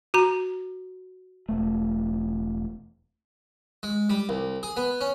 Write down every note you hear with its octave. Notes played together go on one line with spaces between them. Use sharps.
F#4 A#5
E1 A3
G#3
G3
C2
G#4
B3
C#4